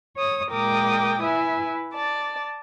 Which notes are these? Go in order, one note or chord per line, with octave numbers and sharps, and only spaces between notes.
C#5 D#6
A#2 G#3 A#4 G5 D6 D#6
E4 B4 E5 G#5
D5 A5